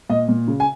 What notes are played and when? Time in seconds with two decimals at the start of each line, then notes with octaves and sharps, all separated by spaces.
0.09 A#2 D#5
0.28 A#2
0.48 C#3
0.60 G#5